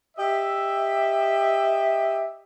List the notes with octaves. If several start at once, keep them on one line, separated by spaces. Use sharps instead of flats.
G4 D#5 E5